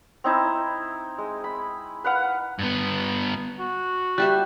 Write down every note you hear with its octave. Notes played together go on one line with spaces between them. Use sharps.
C4 D#4 E4
G#3
B5
B4 F5 F#5
G2 B3
F#4
G3 G4 E5 F#6